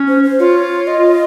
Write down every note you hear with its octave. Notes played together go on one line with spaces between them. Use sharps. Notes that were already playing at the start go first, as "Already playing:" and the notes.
Already playing: C#4
C5
C5
F4 C#5
D#5